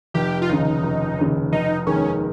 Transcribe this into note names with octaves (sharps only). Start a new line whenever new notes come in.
F1 G4
F4
D#2 C#3 D#4
F1
D#2 C#3
F1 D#4
D#2 D#3 G#3 C#4